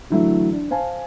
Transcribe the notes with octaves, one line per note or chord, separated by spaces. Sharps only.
D3 E3 F#3 A3 E4
D4
C5 F5 G#5 A5